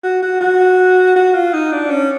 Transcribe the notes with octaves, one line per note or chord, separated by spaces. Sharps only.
F#4
F#4
F#4
F#4
F4
D#4
D4
C#4